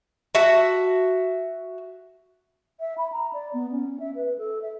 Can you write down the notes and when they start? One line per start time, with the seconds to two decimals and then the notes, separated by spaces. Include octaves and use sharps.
0.35 F#4 E5 A5
2.80 E5
2.98 B5
3.12 A#5
3.33 D5
3.53 B3
3.72 C#4
4.00 E5
4.15 B4
4.38 A4
4.62 E5